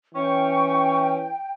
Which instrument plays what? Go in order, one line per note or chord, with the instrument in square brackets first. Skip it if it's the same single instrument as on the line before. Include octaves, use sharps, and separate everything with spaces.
[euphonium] E3 [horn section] C#4 [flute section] G5 [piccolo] C#6